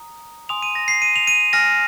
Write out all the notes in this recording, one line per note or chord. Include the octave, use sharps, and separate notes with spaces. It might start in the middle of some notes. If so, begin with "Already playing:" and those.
Already playing: A#5 D#6
G#5 C6 D#6 F7
D#7
A#6
C7
D#7
F7
D#7
G#5 F6 A#6